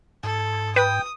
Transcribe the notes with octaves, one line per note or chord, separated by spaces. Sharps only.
G#2 A4
B4 G5 D#6